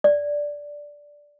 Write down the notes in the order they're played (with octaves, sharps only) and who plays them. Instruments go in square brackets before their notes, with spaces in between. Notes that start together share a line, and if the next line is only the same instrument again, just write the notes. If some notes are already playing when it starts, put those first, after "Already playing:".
[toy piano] D5